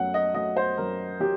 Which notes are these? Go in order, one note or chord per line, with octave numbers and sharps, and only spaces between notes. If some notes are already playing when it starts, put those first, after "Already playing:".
Already playing: F#2 F#3 A3 F#5
D#5
F#3 A3 D#5
C5
F#2 A#4
F#3 G4